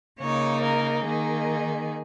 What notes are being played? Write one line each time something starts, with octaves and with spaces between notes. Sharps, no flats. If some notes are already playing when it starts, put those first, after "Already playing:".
C#3 A#3 D#4 C#5
A#4
D#3 A#3 D#4 G#4